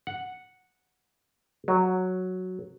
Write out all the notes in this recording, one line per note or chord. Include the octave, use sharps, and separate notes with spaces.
F#5
F#3